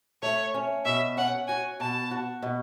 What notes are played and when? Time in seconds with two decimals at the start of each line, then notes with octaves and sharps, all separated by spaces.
0.22 A3 C#5
0.54 C#4
0.85 B2 E5
1.17 C#4 F#5
1.48 F#4 G#5
1.80 B2 A5
2.11 F#4
2.42 B2